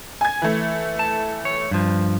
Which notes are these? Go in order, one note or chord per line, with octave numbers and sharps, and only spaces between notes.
G#5 G#6
E3 A3
A5
C#5
G2 F3